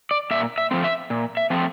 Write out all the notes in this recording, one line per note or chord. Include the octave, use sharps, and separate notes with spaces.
D5
A#2 E5
E5
F3 A3 C4
E5
A#2
E5
F3 A3 C4